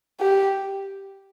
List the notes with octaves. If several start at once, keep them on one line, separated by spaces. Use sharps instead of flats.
G4